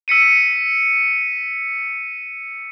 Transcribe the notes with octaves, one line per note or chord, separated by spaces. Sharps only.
E6 B6 C#7 D#7